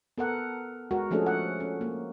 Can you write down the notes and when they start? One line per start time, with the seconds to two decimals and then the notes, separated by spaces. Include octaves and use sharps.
0.18 B3 A4 A#4 F#5
0.91 G#3 F#4 A#4
1.11 F3 A3 C#4 D4 G#4 A4
1.26 F#5
1.60 C#4
1.81 A#3